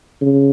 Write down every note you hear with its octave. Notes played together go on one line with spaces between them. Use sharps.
C#3